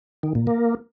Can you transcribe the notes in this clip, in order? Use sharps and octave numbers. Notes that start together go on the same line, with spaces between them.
D#3
A#2
A#3